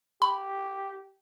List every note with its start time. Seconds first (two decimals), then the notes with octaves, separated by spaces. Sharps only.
0.22 G4 B5